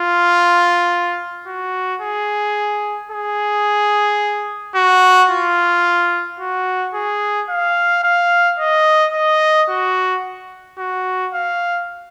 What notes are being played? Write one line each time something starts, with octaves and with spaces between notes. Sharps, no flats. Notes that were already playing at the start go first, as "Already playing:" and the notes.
Already playing: F4
F#4
G#4
G#4
F#4
F4
F#4
G#4
F5
F5
D#5
D#5
F#4
F#4
F5